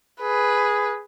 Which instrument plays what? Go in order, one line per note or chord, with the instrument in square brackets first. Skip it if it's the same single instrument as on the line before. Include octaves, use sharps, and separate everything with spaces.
[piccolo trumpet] G#4 [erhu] B4